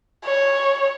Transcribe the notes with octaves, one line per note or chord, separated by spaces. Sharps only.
C#5